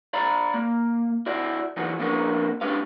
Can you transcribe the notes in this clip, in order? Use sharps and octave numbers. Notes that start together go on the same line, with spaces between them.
D5 F5 A#5 B5
A#3
E4 F#4 D5
E3 F#3 B3 D#4 F#4
F3 A#3 B3 C#4 D4 A#4
G3 A3 C#4 D4 B4 F5